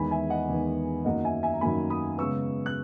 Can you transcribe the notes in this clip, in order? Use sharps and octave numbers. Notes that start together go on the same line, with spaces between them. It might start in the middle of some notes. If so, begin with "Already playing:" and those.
Already playing: E2 D#3 G#3 B3 G#5 B5
E5 G#5
D#5 F#5
E2 D#3 G#3 B3
F#2 D#3 F#3 A#3 D#5 F#5
E5 G#5
E5 G#5
A#5
F#2 D#3 F#3 A#3 G#5 B5
B5 D#6
C#3 G#3 B3 C#6 E6
F#6